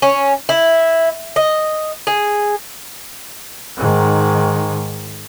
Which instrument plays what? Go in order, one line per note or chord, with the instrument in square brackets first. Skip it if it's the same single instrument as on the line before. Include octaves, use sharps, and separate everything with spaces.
[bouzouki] C#4
E4
D#5
G#4
[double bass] G#2 D#3